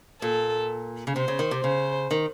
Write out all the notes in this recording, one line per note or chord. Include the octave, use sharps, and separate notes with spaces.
A#2 A4
C#3
C3 C5
C#3
D#3
C3
C#3 C5
D#3